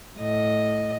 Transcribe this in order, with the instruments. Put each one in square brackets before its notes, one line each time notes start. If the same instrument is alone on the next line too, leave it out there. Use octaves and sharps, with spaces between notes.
[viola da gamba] A2 D#5